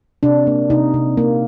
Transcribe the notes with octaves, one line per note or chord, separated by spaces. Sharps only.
C3 D4
A#3
C3 D#4
C3
A#3